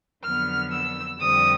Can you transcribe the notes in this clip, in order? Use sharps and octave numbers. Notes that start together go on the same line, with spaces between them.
F2 D3 F#3 B3 F6
E6
F2 D3 G3 C4 D#6